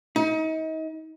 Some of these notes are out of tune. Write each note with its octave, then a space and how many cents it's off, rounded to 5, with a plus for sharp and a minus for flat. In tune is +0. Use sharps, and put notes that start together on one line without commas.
D#4 +35